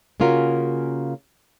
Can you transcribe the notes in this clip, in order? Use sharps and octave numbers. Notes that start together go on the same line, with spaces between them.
C#3 A#3 C#4 F4 F#4 A#4